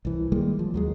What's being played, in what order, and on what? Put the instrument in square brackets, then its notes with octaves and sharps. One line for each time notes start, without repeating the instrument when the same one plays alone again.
[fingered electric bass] C2 E3
D#3 G3 G#3 A#3
F3
D#2 F#3 G#3